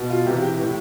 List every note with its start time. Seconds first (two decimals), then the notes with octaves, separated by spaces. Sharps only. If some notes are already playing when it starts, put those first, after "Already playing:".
Already playing: B2
0.10 F4
0.26 C3 E3 G4
0.42 G4
0.58 A2 E3